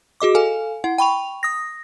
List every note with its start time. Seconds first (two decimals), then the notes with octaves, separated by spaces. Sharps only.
0.20 F#4 G#4 D#5 D6
0.35 A4 F5 G#5
0.84 E4 F#5
0.98 G5 B5 C#6 F7
1.43 D#6 A#6